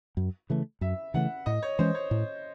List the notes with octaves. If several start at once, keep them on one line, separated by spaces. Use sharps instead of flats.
F#2
C#3 E3 A3
F#2 E5
C#3 E3 A3 F#5
A2 D#5
C#5
E3 G#3 C#4 C5
C#5
A2